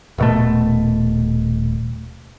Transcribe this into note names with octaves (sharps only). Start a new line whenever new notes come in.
D#1 B2 A3